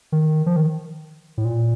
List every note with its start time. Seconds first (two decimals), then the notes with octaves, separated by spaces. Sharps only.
0.12 D#3
0.46 F3
0.56 D#3
1.38 A2
1.45 A#2